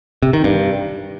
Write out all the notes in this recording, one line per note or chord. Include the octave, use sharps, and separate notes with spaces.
C3
D#3
G2